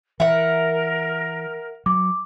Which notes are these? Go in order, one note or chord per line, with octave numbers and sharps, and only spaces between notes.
E3 A#4 E5 F#5
F#3 D6